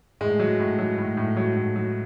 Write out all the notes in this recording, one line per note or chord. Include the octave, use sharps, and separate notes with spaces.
A2 G#3
F#3
A2
F#3
A2
A2
F#3
A2
F#3